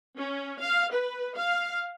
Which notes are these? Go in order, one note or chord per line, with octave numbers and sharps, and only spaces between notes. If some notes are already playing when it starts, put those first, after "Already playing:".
C#4
F5
B4
F5